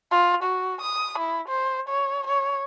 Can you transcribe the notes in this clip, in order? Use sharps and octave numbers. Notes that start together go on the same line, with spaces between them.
F4
F#4
D#6
E4
C5
C#5
C#5